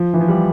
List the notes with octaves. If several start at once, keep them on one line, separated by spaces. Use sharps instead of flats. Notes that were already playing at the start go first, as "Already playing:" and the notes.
Already playing: F3
E3
F3
G3